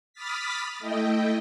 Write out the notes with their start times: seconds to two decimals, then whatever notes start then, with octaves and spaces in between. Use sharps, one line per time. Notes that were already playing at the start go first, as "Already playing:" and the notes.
0.13 B5 D6 D#6 F6 A6 B6
0.79 A3 E4 D#5 G5